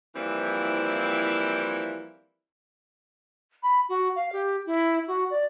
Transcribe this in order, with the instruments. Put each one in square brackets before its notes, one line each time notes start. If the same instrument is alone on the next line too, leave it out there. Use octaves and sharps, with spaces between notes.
[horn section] E3 F3 G3 A#3 C4 E4
[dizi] B5
F#4
F5
G4
E4
F#4
D5